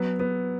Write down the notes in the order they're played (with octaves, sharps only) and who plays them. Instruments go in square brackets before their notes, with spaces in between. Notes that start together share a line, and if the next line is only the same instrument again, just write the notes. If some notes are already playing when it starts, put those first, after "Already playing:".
Already playing: [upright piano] F#3 B3
B3